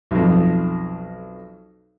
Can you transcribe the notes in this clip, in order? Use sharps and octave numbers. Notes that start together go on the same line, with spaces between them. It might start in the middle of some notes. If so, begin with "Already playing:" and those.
B1 F2